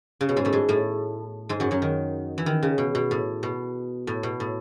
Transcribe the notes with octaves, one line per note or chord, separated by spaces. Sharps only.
C#3
B2
G#2 G#3
A2 A3
G#2 G#3
A2 A3
G#2 G#3
F#2 F#3
F#2 F#3
D#3
E3
D#3
C#3
B2
B2
A2
B2
A2
B2
A2